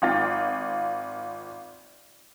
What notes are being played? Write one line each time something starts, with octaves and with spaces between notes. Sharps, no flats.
G#1 F4 A6